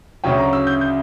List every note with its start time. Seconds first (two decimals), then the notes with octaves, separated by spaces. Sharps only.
0.24 D2 C#3 F#3 C#4 G5
0.38 A#5
0.53 E6
0.67 G6
0.81 G6